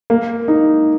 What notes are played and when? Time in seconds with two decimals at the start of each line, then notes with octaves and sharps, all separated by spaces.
0.10 A#3
0.48 D#4